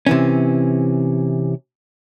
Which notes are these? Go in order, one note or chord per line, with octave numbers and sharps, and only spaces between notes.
C3 E3 C#4